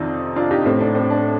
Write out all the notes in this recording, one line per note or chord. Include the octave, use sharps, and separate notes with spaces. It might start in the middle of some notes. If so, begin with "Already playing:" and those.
Already playing: F2 C3 D#3 C4 D#4 D5
D4 F4
D#4 G4
A2 C4
D4
C4
D4